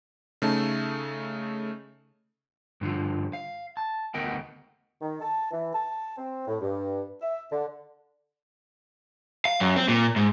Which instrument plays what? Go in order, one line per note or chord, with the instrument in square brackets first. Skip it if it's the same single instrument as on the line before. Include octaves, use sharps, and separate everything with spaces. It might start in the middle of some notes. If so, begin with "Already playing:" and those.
[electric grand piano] C#3 A3 D#4 A5
[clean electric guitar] G2 D3 F3
F5
A5
D2 B3 A#4 D#5 F#5 G5
[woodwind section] D#3
A5
E3
A5
C4
A2
G2
E5
D3
[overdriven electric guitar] F5
F#2
C4
A#2
G#2